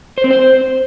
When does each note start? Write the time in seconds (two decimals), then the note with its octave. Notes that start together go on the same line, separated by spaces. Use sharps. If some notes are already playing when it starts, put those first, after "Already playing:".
0.18 C5
0.24 C4
0.31 C5